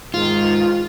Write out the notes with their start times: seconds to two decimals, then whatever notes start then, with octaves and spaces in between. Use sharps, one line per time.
0.14 G#2 D#3 F4